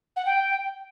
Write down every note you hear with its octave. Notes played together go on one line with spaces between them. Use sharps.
F#5
G5